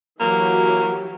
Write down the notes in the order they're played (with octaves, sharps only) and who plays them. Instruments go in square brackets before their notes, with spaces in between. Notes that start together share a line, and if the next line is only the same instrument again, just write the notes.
[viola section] E3 F#3 G4 [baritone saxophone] A#3